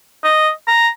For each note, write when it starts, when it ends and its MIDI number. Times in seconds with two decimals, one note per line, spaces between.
0.24 0.51 75
0.68 0.89 82